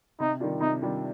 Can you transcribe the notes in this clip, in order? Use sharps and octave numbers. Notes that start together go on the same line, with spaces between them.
C3 D#4
D#3 G3 D4 F4
C3 D#4
D#3 G3 D4 F4